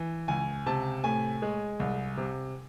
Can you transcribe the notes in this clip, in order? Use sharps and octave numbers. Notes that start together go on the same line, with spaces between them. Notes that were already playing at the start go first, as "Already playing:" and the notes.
Already playing: E3
C#2 G#5
C3 A5
A2 G#5
G#3
C2
C3